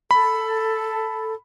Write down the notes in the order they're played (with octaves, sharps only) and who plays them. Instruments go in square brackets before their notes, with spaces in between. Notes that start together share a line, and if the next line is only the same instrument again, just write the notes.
[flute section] A4 [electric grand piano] B5